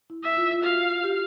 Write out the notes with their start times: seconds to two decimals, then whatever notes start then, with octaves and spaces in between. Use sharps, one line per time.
0.10 E4
0.23 E5
0.37 F4
0.54 F4
0.63 F#4 F5
1.04 G4